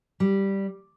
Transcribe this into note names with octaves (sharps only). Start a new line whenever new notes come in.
G3